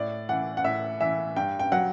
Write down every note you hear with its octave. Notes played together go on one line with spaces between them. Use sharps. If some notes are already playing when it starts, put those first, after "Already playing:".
Already playing: A2 D5
E3 F#5
F#5
A2 E5
E3 E5
G2 G5
G5
F#3 F#5